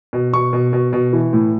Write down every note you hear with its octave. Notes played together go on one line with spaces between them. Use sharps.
B2
B2 C#6
B2
B2
B2
E3
A2